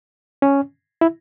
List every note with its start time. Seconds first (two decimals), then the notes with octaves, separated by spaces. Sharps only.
0.42 C#4
1.01 E4